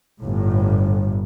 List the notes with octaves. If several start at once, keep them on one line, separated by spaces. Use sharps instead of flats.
G1 A2